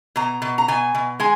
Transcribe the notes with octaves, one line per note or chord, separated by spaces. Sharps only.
B2 A#5
B2
A#5
B2 G#5
B2
G#3 G#5